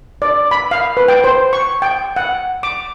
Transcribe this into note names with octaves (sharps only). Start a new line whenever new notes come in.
D5
B5
F5
B4
G5
C5
C#6
G5
F#5
D6